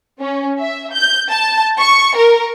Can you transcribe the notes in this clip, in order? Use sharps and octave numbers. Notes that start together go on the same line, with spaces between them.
C#4
E5
G6
A5
C#6
A#4